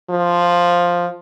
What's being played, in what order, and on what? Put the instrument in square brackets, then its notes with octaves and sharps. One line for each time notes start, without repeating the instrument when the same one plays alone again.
[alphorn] F3